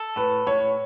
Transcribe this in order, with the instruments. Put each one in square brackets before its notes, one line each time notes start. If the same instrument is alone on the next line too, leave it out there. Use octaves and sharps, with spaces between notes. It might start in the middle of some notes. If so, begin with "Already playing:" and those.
Already playing: [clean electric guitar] A4
[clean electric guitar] A2 [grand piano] B4
[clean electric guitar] A2 [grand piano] C#5